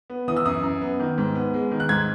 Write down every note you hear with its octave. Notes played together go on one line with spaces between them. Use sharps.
B3
E3 D#6
E6
F#2 D#6
F#2
B3
D#3
G#2
B3
G#3
D#3
F#6
G#2 G#6